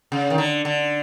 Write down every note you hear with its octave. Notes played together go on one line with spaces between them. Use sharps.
C#3
D#3
D3
D3